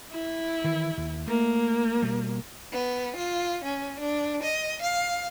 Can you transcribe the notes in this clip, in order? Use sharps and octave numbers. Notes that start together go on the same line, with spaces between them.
E4
D#3 E3
D#2
A3 A#3
B2 G3
B3
F4
C#4
D4
D#5
F5